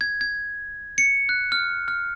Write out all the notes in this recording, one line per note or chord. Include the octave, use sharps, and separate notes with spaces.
G#6
G#6
C#7
F#6
F6
F6